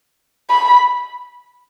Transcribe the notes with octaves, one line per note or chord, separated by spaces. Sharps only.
B5